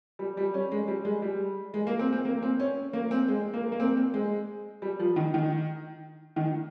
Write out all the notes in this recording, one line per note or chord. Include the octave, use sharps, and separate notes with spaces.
G3
G3
C#4
G#3
G3
G#3
G3
G#3
A#3
C4
C4
A#3
C4
C#4
A#3
C4
G#3
A#3
A#3
C4
C4
G#3
G3
F3
D#3
D#3
D#3